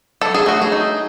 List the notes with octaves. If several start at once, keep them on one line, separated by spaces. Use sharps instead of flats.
F#3 A4
G#4
A3 F#4
G#4
D#4